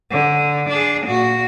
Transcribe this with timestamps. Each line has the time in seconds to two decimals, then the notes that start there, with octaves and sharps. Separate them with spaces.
0.11 D3
0.69 D4 G#4
1.06 A#2 F#4